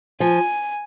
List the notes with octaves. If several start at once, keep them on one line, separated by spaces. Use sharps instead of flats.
F3 G#5